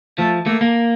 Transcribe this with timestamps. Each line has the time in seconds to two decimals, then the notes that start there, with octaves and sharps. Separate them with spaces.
0.18 F3 A3
0.46 A3 A#3
0.61 A#3